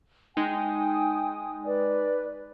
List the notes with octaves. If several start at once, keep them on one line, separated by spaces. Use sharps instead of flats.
G#3 D#4 G5 G#5 D#6
B4 D5